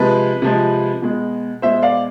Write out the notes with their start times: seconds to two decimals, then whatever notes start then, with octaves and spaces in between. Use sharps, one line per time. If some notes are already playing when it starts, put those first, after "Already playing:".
Already playing: C3 F3 G#3 B4
0.42 C3 F3 G#3
1.02 B2 G#3
1.62 B2 G#3 C5 E5
1.82 D5 F5